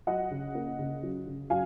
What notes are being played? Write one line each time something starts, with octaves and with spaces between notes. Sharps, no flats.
F#3 D#5 F#5
C#3
A#3
C#3
F#3
C#3
F#3 F5 G#5